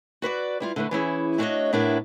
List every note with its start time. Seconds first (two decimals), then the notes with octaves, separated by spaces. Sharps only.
0.22 F#4 B4 C5 D5
0.60 G3 E4 F4
0.76 D3 A3 B4
0.91 E3 C#4 E4 G#4
1.38 A3 D4 F#4 C5 C#5 D#5
1.73 A2 B3 D4 E4 A#4 E5